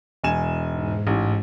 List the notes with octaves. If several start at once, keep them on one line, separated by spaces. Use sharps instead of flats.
E1 G#5 E7
G#2
A1